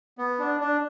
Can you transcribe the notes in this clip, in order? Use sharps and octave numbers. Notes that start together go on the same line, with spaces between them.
B3
D4
D4